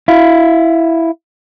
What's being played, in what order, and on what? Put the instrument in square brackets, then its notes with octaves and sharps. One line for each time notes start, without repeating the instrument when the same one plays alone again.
[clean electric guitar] E4 F5